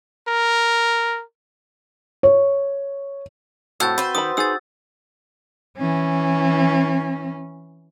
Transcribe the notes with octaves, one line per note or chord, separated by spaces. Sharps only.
A#4
C#5
A2 C4 F#4 E6 G6 A6
B4 C5
D#3 C4 B5 D#6
D#4 G#4 G#5 E6 A6
E3 C#4